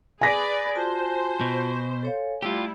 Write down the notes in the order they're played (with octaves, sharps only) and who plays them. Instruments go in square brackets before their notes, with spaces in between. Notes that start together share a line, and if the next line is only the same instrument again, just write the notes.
[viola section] G#4 B4 D5 [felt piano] G#5 A#6 B6
[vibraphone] F4 F#4 A5 [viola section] C5
[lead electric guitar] B2
[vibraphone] A4 C#5 F5
[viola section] G3 E4 [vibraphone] A3 E6 [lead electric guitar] F4 G4